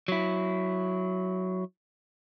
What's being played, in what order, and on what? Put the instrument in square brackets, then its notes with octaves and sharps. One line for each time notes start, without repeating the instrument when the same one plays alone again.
[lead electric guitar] F#3 E4